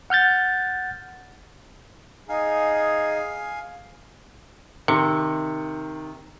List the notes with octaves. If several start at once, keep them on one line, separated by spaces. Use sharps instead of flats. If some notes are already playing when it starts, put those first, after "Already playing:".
F#5 F6 G6 A6
D#4 G#4 F5 G#5
C3 D#3 C#7